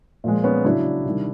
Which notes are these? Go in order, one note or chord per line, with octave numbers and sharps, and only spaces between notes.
A#2 F3 G#3
B3 C#4
C#3 F#3 D4 E4
C3 D#3 G3